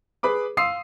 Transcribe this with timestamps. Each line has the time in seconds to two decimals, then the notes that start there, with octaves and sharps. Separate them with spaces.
0.23 G#4 B4 B5 D6
0.57 F5 C6 D#6 E6 C7